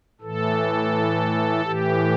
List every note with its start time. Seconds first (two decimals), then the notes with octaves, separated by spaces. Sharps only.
0.21 A2 E3 A4
1.64 A2 E3 G4